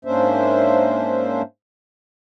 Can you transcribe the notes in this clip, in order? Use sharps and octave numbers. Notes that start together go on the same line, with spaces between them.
G#2 A#3 C#4 D4 C5 E5